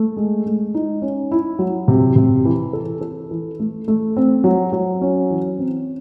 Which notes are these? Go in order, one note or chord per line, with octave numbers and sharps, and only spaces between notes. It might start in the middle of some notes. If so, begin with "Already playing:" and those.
Already playing: A3
G#3
G#3
D#4
C#4
E4
F#3
C3
C3
E3
A4
A4
E3
A3
A3
C4
F#3
F#3
C#4
E3
C4